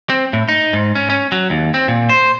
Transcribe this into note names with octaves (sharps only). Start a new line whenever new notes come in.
C4
A2
D#4
G#2
C#4
C#4
F#3
D#2
C4
A#2
C5